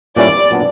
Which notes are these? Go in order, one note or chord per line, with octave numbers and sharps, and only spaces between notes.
A#2 G3 C#4 E4 D5
A#2 F#3 B3 D4